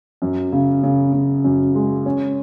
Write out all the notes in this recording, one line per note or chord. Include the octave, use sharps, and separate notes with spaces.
F#2
C#3
C#3
C#3
F#2
G#3
C#4